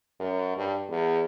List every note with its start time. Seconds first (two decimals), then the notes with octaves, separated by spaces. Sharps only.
0.20 F#2
0.56 G2
0.89 E2